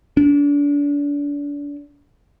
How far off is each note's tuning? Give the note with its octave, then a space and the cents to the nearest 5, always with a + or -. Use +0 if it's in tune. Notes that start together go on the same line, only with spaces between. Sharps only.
D4 -35